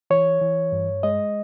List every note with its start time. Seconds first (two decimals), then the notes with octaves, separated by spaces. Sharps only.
0.10 E3 C#5
0.41 E3
0.72 G2
1.03 G#3 D#5